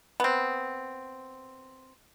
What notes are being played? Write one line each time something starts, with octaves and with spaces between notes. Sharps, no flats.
B3 C4